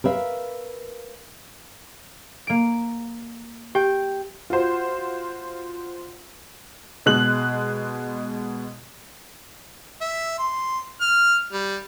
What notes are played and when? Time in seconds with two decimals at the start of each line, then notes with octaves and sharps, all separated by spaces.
0.04 A#4 B4 E5 F5
2.47 A#3 D7
3.75 G4 G5
4.50 F4 F#4 C5
7.06 B2 G#3 F#6 F#7
10.01 E5
10.39 C6
11.01 F6
11.52 G3